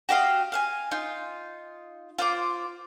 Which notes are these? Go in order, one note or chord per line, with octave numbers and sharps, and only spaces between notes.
F#4 G4 D#5 F5
F5 F#5 G#5
D#4 F4
F4 C5 D6